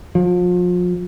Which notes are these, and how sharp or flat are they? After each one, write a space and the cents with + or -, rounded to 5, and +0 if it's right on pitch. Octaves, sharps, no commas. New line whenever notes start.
F3 +35